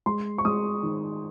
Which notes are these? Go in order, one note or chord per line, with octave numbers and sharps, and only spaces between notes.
G#3 C6
C#6
G#3 D#6
D#3